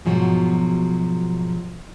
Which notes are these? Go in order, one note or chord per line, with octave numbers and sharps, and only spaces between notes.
G#2 B2 F3 F#3